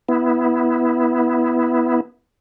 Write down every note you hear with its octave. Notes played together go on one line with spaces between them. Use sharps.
B3 E4